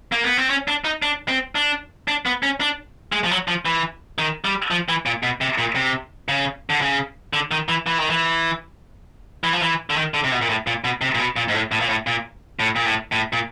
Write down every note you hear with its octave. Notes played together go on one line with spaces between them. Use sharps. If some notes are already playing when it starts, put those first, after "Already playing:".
A#3
B3
C4
C#4
D4
D#4
D4
C4
D4
D4
B3
C#4
D4
G#3
F3
F#3
F3
E3
D#3
G3
F3
E3
A#2
B2
C3
A#2
C3
C#3
D3
C#3
D3
D#3
E3
E3
D#3
E3
E3
F3
E3
D3
D#3
D3
C3
B2
A#2
A2
A#2
B2
C3
A#2
B2
A#2
G#2
A2
A2
A#2
A2
A#2
A2
A#2
A2
A2
A#2